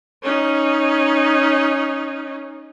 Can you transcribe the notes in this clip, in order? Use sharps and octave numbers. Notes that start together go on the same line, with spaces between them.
C#4 D#4